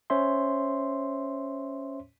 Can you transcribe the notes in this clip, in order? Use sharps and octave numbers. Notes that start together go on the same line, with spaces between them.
C#4 C5 C#5 E5 C6